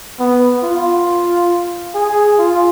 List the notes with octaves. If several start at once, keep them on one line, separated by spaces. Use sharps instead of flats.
B3
F4
G#4
F4